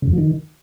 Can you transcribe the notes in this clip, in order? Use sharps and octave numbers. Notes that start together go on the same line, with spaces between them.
C#3
F2
F3
D#3